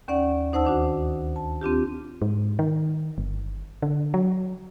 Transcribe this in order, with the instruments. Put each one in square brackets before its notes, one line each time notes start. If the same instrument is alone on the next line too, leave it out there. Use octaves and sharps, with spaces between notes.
[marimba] D#2 C#4 D5 F#5
D2 D#4 C5 F#5 A5 E6
D#3 D4 F#4
A5
C4 D4 F4 G4
[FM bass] G#2
D#3
G1
D3
F#3